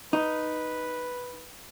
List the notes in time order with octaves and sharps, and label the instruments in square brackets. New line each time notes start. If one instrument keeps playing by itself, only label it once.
[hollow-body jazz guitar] D#4 [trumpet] B4